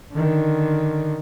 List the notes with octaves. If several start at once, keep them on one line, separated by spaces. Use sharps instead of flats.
D3 D#3